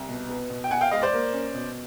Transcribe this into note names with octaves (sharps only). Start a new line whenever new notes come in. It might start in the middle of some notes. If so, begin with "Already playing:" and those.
Already playing: C2
B2
B3
B2
G5
B2 F#5 G#5
F5 G5
G#3 D#5 F5
C5 D5
A#3
C#4
B2